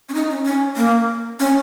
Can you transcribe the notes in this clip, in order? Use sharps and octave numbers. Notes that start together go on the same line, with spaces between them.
C#4
D#4
C#4
C#4
A#3
C#4